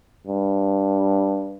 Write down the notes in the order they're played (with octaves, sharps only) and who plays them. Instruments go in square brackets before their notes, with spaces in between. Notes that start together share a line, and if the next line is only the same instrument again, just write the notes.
[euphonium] G2